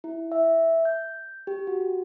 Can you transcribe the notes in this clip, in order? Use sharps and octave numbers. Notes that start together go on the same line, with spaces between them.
E4
E5
G6
G4
F#4